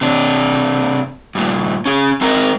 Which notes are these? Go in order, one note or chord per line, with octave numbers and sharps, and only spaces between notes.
C3 D4
G2 A#2
C#4 G#4
G#3 C4 D#4 A#4